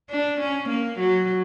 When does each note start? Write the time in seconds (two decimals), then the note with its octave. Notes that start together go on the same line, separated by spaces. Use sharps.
0.10 D4
0.40 C#4
0.69 A#3
0.99 F#3